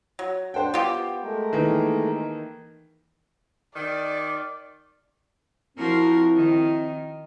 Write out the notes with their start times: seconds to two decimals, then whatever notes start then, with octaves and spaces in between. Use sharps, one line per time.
0.19 F#3
0.54 G2 D4 C5 F#5 G5
0.74 B3 F4 G4
1.23 G#3 A3 A#4
1.52 D#3 E3 A#3
3.75 D#3 D5
5.78 F3 C4 E4 F#4 A#4
6.36 D#3